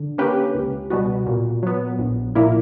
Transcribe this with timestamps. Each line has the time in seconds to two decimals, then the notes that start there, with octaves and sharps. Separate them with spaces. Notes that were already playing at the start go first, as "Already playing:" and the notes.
Already playing: D3
0.18 A#3 C#4 G4 B4
0.54 C#2
0.90 B2 G3 B3 F#4
1.26 A#2
1.63 F#3 B3
1.99 A#1
2.35 A#2 A#3 E4